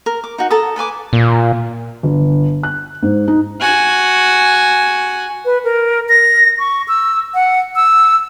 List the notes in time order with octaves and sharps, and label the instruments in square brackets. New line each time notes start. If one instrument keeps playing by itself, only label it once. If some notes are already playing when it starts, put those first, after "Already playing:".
[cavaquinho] A#4
D6
D#4 F#4
A4 A5 A#5 D#6
A4 B4 G#5 D6
[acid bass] A#2
[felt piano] G1
F#6
G#2
D#4
[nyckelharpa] F#4 G#5
[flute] B4
A#4
A#6
C#6
E6
F#5
E6